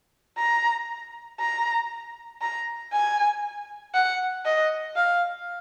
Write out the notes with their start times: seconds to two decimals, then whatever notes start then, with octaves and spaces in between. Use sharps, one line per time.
0.38 A#5
1.40 A#5
2.41 A#5
2.92 G#5
3.94 F#5
4.45 D#5
4.96 F5